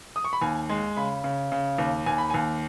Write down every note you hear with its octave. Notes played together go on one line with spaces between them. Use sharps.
D#6
C#6
B5
D#2 G#5
G#3
C#3 B5
C#3
C#3
D#2
D#2 G#5
B5
D#2 G#5